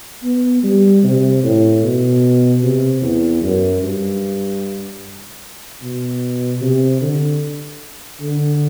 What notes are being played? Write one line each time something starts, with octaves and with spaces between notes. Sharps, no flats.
B3
G3
C3
A2
B2
C3
E2
F#2
G2
B2
C3
D3
D3